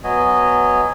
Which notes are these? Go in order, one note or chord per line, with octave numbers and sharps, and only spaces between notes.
F#3 B3 D#5 G#5